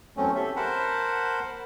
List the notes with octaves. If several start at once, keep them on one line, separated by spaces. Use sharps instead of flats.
E2 F#3 A3 C4 C#4
G4 A4 E5
A#4 C5 F#5 A5 B5